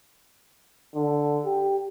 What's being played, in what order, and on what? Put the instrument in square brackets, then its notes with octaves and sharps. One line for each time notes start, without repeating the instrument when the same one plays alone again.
[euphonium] D3
G4